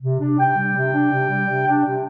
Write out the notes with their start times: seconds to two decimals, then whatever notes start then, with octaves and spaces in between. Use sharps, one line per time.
0.03 C3
0.20 D4
0.39 C3 G5
0.57 G3
0.76 C3
0.93 D4
1.12 C3
1.30 G3
1.49 C3
1.67 D4
1.85 C3